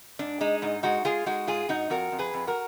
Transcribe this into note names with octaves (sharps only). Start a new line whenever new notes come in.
G#2 D4
G#3 D#4
G#2 D#4
G#3 D#4 F#4
G#3 F4 G#4
G#3 D#4 F#4
G#2 F4 G#4
G#2 D#4 F#4
F2 F#4 A#4
F2
G#4 B4
F2
F#4 A#4